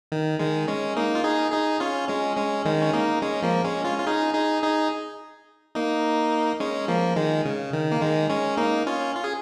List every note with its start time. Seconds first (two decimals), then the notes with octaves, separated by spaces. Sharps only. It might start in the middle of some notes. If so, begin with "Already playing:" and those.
0.12 D#3
0.39 D#3 G#3
0.68 G#3 C#4
0.97 A#3 D#4
1.15 F4
1.24 D#4 G#4
1.52 D#4 G#4
1.80 C#4 F4
2.08 G#3 C#4
2.37 G#3 C#4
2.65 D#3 G#3
2.82 C#4
2.93 A#3 D#4
3.22 G#3 C#4
3.42 F3 A#3
3.64 G#3 C#4
3.85 C#4 F4
3.98 F4
4.07 D#4 G#4
4.34 D#4 G#4
4.62 D#4 G#4
5.75 A#3 D#4
6.60 G#3 C#4
6.88 F3 A#3
7.16 D#3 G#3
7.45 C#3
7.73 D#3
7.92 A#3
8.01 D#3 G#3
8.30 G#3 C#4
8.57 A#3 D#4
8.87 C#4 F4
9.15 F4
9.24 G#4